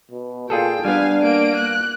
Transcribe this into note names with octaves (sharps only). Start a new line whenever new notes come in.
B2
A#2 F4 G#4 A4 G5
G3 B3 D4 F5 G#5
A#3 D7
F#6